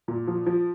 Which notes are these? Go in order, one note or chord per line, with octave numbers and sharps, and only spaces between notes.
A#2
F3
F3